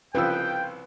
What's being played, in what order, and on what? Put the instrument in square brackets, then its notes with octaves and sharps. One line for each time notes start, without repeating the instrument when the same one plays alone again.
[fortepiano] C2 C#3 F3 [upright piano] F4 E6 [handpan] B4 [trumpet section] G5